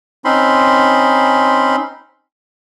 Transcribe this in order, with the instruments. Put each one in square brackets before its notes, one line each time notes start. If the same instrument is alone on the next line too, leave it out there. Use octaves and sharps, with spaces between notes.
[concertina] C4 C#4 D#4 B5 C6